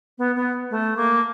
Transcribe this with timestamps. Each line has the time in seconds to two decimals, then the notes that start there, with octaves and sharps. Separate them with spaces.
0.18 B3
0.36 B3
0.71 A3
0.97 A#3